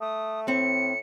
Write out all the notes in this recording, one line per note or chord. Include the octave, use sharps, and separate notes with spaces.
A3 D#6
A2 C4 C#7